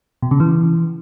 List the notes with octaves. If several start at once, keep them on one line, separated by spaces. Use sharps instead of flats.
B2
C#3
E3